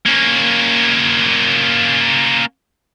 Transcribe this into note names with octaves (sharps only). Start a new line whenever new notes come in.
A#3 C#4